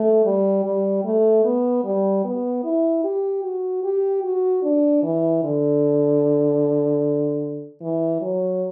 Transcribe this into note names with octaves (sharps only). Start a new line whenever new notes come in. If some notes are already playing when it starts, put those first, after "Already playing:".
Already playing: A3
G3
G3
A3
B3
G3
B3
E4
G4
F#4
G4
F#4
D4
E3
D3
E3
F#3